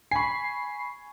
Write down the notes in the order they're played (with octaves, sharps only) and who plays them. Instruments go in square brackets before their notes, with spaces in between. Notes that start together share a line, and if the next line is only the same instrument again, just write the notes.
[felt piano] G#5 C#6 [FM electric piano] B5 C7